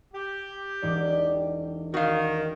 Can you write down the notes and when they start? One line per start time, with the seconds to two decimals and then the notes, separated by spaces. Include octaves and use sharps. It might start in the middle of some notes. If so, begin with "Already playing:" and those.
0.14 G4
0.82 E1 D#4 D5
1.94 D#3 F#4 F5